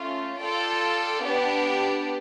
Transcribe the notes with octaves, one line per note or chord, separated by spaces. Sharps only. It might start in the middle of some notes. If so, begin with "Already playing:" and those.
Already playing: A3 C#4 F4
F4 A4 D5 G5
B3 D4 G4